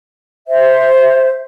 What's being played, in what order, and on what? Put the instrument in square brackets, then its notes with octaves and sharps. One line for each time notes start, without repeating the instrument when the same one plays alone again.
[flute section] C5 E5